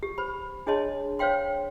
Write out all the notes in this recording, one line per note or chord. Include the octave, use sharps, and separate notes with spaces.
G4
C5 B5
D4 G#4 C#5 D#5 A5 C6
C5 C#5 F5 G5 C6